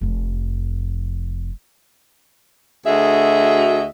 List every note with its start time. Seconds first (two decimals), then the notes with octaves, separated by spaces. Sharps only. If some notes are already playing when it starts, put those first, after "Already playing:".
0.01 F1 F2
2.86 D2 F#4 G#4 D#5 E5